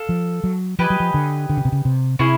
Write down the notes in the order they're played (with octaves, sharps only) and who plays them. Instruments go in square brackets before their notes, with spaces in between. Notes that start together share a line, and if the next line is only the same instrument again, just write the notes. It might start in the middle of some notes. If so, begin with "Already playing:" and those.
Already playing: [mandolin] A4 F5
[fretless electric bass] F3
F#3
[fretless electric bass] F3 [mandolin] G4 B4 D#5 G#5
[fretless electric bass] F#3
F3
D3
D3
C#3
C3
C#3
C3
[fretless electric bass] C3 [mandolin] C#4 E4 G#4